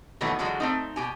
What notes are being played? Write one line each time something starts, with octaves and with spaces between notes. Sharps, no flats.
B2 D#3 E3 F#3 A3 B3
D3 E3 F#3 G#3 F4 F#4
A3 C4 D#4
B2 G4 G#5